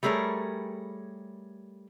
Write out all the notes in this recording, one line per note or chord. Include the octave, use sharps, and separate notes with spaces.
G3 A3 G#4 A#4 C#5